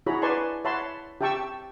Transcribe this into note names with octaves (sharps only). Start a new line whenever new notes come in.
E4 F#4 G#4 C#5 A#5 B5
B4 D5 G#5 A5 C6 C#6
C#5 E5 F#5 A5 B5 C6
G4 E5 G5 A5 C#6 E6